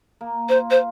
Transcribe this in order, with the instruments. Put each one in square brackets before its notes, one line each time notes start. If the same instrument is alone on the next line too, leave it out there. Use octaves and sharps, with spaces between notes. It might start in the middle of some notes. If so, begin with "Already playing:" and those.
[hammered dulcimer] A#3
[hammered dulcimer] F4 [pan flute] C5
[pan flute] C5